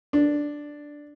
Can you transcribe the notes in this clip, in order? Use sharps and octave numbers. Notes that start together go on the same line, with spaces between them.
D4